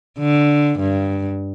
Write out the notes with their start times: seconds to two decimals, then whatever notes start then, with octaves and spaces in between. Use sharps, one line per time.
0.19 D3
0.80 G2